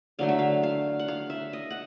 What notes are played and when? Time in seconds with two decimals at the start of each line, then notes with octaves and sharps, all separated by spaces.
0.19 D3 F#3 A3 F5
0.29 E5
0.39 F5
0.63 F5
0.99 F#5
1.08 F5
1.30 E5
1.53 D#5
1.70 F#5